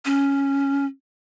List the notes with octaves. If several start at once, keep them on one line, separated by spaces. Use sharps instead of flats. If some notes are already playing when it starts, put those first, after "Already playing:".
C#4